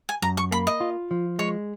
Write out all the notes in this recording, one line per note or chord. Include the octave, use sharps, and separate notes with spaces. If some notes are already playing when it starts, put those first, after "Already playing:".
G#5
F#2 A#5
C#6
A#3 B5
D#5
F4
F3
G#3 C#5